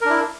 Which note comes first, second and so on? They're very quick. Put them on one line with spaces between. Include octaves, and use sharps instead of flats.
A#4 D4 E4